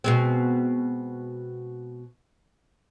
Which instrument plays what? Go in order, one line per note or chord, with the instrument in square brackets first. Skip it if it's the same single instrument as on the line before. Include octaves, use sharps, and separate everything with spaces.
[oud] B2 G#3 C4